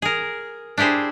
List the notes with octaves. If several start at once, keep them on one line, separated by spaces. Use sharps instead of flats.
G#4 A#4
D4 E4 G4 G#4 C5